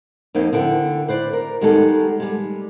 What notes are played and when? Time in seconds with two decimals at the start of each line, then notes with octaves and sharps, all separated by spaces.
0.35 F2 A#3 C4 D#4
0.53 D3 E4 G5
1.08 B4 C5 D5
1.33 A#4
1.61 D#3 G3 G#3 B3 G4 A4
2.20 G3 G#3